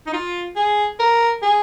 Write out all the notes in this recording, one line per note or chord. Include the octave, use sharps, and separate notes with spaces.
D#4
F4
G#4
A#4
G#4